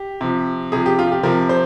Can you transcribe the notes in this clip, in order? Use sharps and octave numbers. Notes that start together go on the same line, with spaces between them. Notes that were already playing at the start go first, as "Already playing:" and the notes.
Already playing: G4
C3 F3
C3 F3 G#4
G4
F4
G4
C3 F3 A#4
C5